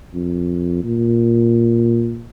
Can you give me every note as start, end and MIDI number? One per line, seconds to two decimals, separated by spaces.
0.14 0.83 41
0.84 2.29 46